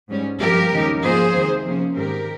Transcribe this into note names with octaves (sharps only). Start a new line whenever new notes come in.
G#2 G3 C#4
G2 F3 A#3 G4 A#4
D#2 C#3 G#3 D#4
G#2 F3 A#3 F4 G#4 C5
F2 C3 D#3 A#3
C3 F3 A#3 C#4
G#2 D#3 G#3 C4 G4 A#4